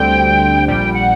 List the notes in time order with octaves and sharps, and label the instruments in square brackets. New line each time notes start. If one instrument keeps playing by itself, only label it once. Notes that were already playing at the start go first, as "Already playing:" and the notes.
Already playing: [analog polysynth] D2 D3 G3 C4 [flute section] G5
[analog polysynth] A#1 A#2 G3 [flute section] G5
[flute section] F#5